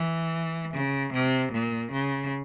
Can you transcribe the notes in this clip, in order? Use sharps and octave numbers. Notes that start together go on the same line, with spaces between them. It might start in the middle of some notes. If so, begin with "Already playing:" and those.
Already playing: E3
C#3
C3
A#2
C#3